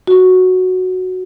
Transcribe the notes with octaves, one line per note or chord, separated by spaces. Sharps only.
F#4